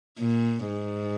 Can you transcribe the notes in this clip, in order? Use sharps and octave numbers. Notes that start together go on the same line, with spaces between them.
A#2
G#2